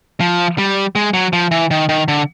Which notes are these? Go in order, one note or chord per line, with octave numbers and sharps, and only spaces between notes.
F3
G3
G#3
F#3
F3
E3
D#3
D#3
D3